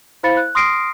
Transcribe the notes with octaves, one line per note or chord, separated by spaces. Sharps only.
E4 C5 F5 B5 A6 C#7
F#6
C6 D#6 F6 A#6 C7 D7